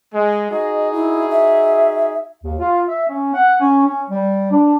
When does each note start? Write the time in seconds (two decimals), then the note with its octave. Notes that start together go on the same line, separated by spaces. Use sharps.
0.13 G#3
0.51 D#4 F#4 G#4 D#5
0.92 E4
1.29 E5
2.44 D#2
2.59 F4
2.88 E5
3.09 C#4
3.34 F#5
3.60 C#4
3.86 C#4
4.10 G3
4.52 D4